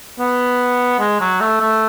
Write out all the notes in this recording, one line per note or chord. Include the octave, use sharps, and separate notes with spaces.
B3
G#3
F#3
A3
A3